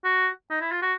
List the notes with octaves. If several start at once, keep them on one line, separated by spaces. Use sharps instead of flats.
F#4
D#4
E4
F4
F#4